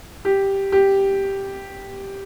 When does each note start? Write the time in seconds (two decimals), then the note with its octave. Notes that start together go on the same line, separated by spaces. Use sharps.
0.25 G4
0.72 G4